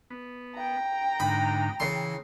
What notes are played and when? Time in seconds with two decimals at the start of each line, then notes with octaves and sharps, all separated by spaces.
0.10 B3
0.56 G5 A#5
1.20 G#2 D3 D#4 B5
1.80 C#3 E3 C6